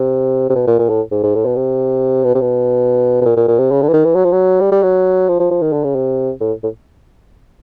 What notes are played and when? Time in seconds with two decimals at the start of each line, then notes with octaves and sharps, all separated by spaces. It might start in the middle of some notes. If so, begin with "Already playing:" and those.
Already playing: C3
0.50 C3
0.55 B2
0.67 A#2
0.79 A#2
0.89 A2
1.11 G#2
1.23 G#2
1.35 A2
1.46 B2
1.56 C3
2.24 B2
2.35 C3
2.41 B2
3.22 B2
3.26 A#2
3.37 A#2
3.48 A#2
3.59 C3
3.71 C#3
3.82 D3
3.89 E3
3.93 D#3
4.05 E3
4.15 F#3
4.25 F3
4.32 F#3
4.61 G3
4.72 G3
4.83 F#3
5.28 F3
5.40 F3
5.51 F3
5.62 D#3
5.73 D3
5.84 C#3
5.95 C3
6.41 A2
6.63 A2